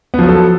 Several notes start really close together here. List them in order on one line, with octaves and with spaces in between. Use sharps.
B3 F3 F#3 A4